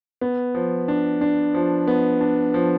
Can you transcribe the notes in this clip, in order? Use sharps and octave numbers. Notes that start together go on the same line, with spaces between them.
B3
F3
D4
D4
F3
B3
D4
F3